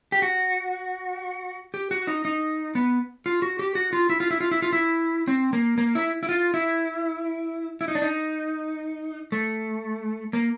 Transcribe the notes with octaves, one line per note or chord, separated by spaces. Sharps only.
G4
F#4
G4
F#4
D#4
D#4
B3
F4
F#4
G4
F#4
F4
E4
F4
E4
F4
E4
F4
E4
C4
A#3
A#3
E4
E4
F4
E4
E4
D#4
D4
D#4
A3
A#3